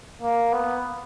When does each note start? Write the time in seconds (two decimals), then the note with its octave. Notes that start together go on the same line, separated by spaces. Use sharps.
0.22 A#3
0.52 B3